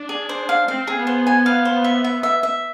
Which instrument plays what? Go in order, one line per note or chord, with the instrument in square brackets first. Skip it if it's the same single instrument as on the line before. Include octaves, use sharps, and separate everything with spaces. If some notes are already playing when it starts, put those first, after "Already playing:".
Already playing: [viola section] D4
[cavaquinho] G#4
C5
F5
[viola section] C4 [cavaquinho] F5
[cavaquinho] G#4
[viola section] B3
[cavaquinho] C5
G#5
F5
C5
E5
E5
E5
E5